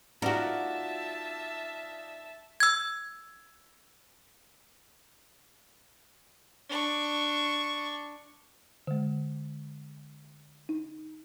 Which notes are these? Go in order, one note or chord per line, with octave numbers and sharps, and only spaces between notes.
D#4 F4 F#4 A#4 D5 E5 A5
E6 G#6
D4 C#6
D3 G#3
D#4